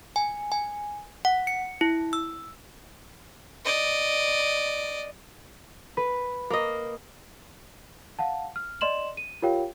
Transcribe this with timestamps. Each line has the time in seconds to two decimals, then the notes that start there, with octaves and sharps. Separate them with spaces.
0.16 G#5
0.52 G#5
1.25 F#5
1.47 C#7
1.81 E4
2.13 E6
3.65 D5 D#5
5.97 B4
6.50 A#3 D#5
8.19 F5 F#5 A5
8.56 F6
8.81 D5 D#5 C6 E7 F#7
9.17 D#7
9.42 F4 G4 A#4 C#5 F5 G5